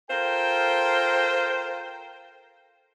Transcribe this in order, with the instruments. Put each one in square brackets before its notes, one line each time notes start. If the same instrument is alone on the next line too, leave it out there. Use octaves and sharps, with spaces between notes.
[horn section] F4 A4 A#4 C5 G5